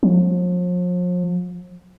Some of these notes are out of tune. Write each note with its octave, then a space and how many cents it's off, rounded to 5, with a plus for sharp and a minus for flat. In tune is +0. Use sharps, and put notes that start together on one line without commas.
F3 +40